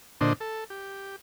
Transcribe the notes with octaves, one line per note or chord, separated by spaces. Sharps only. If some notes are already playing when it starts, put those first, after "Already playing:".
A#2 D3 D4 C5 D#5
A4
G4